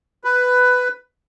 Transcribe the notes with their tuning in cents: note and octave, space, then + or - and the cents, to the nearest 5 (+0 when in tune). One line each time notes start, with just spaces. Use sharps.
B4 +10